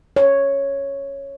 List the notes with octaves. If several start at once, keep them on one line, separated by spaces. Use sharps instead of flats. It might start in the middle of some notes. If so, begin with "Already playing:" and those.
C#5